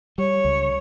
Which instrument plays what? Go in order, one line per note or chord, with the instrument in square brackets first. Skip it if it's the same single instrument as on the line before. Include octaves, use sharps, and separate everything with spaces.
[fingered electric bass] G3 [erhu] C#5
[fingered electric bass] C#2